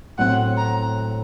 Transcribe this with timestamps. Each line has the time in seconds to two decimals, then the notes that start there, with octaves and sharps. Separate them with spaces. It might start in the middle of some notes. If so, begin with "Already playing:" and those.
0.18 A2 F#3 C4 F#5
0.57 A#5